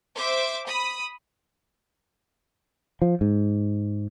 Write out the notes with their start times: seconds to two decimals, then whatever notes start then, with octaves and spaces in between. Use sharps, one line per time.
0.16 C5 E5 D6
0.66 B5 D#6
3.02 F3
3.21 G#2